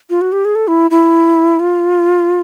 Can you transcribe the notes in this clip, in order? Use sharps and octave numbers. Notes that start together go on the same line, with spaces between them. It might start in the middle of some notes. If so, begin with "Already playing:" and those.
F4
F#4
G4
G#4
A4
E4
E4
F4